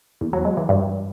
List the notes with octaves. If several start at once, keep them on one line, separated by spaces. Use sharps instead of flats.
E2
F#3
G#3
E3
G2